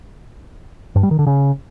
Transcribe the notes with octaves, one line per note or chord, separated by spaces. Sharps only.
G2
G3
D#3
D3
C#3